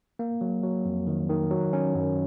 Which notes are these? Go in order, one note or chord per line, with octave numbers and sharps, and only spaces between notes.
A#3
F#3
F#3
F2
D#3
D#3
F#3
C#4
F#2